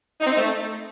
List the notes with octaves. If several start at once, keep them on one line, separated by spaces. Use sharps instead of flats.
D#4
C4
D#4
A3